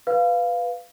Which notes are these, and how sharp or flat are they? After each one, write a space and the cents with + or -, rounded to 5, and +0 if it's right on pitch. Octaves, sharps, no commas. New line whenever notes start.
B4 +5 F5 +0